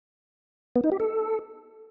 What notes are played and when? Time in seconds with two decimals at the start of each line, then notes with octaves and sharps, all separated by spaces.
0.76 B3
0.84 D#4
0.92 G4
1.00 A4